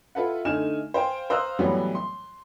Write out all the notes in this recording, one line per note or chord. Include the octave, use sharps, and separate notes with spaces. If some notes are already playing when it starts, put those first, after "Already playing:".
E4 F4 A4 B4 F#5
D3 A3 D#4 G#5 F6 E7
C5 F5 G5 G#5
C5 F5 A#5 D#6 E6 F#6
A2 E3 F#3 G3 B3
C6